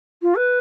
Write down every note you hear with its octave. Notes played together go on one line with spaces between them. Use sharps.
F4
B4